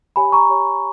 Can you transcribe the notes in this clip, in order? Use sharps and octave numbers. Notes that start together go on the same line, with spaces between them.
G4 C#5 G#5 B5
A#5 C#6
G4 C#5